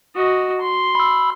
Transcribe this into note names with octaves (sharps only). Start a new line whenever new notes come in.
F#4 D#5
C6
B5 E6